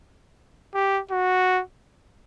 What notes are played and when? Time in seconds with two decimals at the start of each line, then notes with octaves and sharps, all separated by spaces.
0.75 G4
1.11 F#4